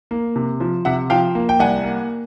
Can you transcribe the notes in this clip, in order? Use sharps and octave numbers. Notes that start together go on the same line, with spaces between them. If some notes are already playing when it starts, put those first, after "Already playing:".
A#3
C3
F3
C3 E5 F#5
F3 F5 G5
A#3
G5
C2 F#5 G#5
A#3